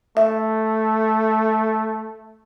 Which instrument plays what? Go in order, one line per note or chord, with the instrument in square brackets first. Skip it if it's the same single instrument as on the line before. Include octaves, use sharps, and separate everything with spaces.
[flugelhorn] A3 [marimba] E5